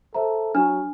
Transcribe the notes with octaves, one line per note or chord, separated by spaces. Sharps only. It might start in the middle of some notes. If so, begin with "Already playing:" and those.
A4 C5 E5 A#5
F#3 D4 F6